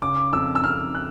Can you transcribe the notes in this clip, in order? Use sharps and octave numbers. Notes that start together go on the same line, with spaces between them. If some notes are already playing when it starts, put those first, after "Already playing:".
C#3 D6
F2 E6
E6
F2 F6
F#6